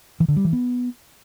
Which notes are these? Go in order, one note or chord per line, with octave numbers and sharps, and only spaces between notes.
E3
D3
G3
E3
B3